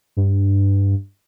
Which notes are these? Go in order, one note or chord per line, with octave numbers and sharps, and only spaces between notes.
G2